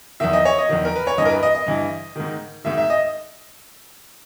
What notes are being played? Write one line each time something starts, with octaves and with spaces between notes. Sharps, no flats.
E2 D#3 E5
D#5
C#5
D#5
E2 D#3
A#4
B4
C#5
G2 E3 D#5
A#4
B4
D#5
D#5
G2 E3
G#2 D#3
G#2 D#3 E5
E5
D#5